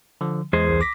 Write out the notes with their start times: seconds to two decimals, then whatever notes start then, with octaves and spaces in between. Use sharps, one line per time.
0.21 D3 F3
0.53 E2 G#3 G#4 C5
0.69 C2
0.81 D6 A#6 B6